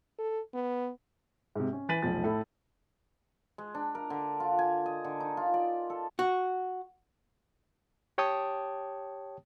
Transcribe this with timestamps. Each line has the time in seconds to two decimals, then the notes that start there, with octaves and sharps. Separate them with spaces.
0.19 A4
0.54 B3
1.55 G#2 C3
1.73 C#4
1.89 E3 G#5 A6 B6 D#7 F#7
2.02 F1 B1 F3 A6
2.24 A2 E4 A4
3.58 G#3
3.75 D4
3.95 A#4
4.10 D3
4.40 F4
4.59 G#5
4.86 D#5
5.04 D3
5.20 D#4
5.37 F4
5.54 D5
5.90 A4
6.19 F#4
8.18 G4 C#5 G5 A5 D#6